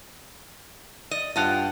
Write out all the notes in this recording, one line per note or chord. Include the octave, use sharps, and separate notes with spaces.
D5 D#5
G2 F4 D#5 F#5 G5 A5